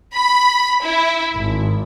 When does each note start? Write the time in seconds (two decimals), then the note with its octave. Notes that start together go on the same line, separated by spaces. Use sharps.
0.14 B5
0.83 E4
1.35 G#1